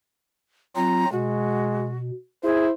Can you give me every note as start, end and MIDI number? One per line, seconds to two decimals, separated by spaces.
0.76 1.05 54
0.76 1.05 60
0.76 1.05 65
0.76 1.12 82
1.12 2.11 47
1.12 1.93 56
1.12 1.98 66
2.43 2.71 64
2.43 2.66 68
2.43 2.74 72